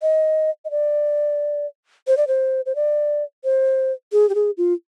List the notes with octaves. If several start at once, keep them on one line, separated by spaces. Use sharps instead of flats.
D#5
D#5
D5
C5
D5
C5
C5
D5
C5
G#4
G4
G#4
F4